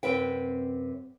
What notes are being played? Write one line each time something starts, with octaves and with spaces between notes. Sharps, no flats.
F#2 C3 C4 B4 G5